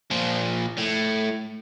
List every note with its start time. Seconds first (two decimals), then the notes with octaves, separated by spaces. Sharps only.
0.11 A#2 F3
0.78 A2